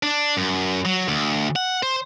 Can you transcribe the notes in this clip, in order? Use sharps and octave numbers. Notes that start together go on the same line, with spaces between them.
D4
F#2
F#3
D2
F#5
C5